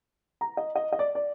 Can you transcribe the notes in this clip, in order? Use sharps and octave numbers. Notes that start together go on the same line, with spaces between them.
A#5
D#5
D#5
D#5
D5
D5